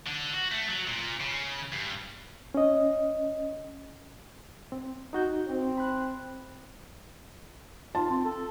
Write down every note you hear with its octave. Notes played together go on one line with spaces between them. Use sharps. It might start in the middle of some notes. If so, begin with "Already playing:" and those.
D3
F#4
A3
F#3
A#2
C#3
G2
C#4 D#5
C4
D#4 F#4 G6
C4
B5 F#6
F4 A5
C4
A4